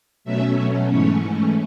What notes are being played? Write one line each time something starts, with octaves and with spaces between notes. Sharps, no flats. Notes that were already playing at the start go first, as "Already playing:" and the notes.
B2 F#3 A3 C#4 E5
G#2 E3 A3 C#4 C#5